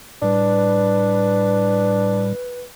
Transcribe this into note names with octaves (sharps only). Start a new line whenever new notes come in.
A2 G3 D4 B4